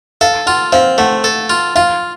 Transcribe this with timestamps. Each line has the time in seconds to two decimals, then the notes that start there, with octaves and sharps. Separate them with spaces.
0.21 A4 F5
0.46 F4 F#5
0.72 C4 F5
0.98 A3 F#5
1.24 A4
1.50 F4
1.75 F4 F5